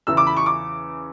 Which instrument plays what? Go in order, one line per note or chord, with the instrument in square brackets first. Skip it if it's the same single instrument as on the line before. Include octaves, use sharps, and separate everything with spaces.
[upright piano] E2 C#3 E3 E6
D6
B5
C#6
D6